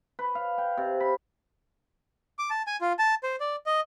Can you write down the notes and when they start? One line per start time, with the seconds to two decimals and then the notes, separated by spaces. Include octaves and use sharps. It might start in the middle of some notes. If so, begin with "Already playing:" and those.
0.19 B4
0.35 F5
0.58 G5
0.77 C3
1.00 B5
2.39 D6
2.50 A5
2.67 G#5
2.81 F4
2.99 A5
3.23 C5
3.40 D5
3.66 D#5